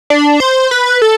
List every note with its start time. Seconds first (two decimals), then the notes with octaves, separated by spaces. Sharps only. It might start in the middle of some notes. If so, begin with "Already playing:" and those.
0.10 D4
0.40 C5
0.71 B4
1.02 A4